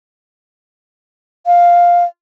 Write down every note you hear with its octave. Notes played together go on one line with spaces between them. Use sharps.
F5